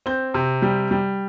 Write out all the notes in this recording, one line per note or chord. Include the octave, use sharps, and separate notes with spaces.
C4 G6
C3
G3
G3